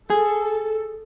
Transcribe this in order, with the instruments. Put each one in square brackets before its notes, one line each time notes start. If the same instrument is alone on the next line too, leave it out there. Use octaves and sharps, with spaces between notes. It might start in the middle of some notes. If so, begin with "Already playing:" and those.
[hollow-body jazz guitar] G#4 [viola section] A4